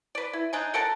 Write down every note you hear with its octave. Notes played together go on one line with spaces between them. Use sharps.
B4 D5
E4
D4 D#4 G#5
A4 A#4 F#5 A5